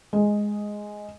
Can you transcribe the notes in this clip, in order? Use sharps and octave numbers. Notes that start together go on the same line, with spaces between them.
G#3